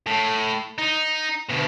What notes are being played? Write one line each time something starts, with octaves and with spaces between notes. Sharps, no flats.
A2
D#4
D2 B2